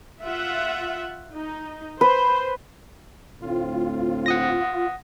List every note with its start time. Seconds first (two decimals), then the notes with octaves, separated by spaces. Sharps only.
0.22 F4 E5 F#5
1.35 D#4
2.01 B4 C5
3.42 D2 A2 C4 F4
4.26 F#5 D#6 A#6